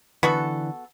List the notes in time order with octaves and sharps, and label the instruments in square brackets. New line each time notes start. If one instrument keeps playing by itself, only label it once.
[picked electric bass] D3 E3 [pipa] B3 F#4 A4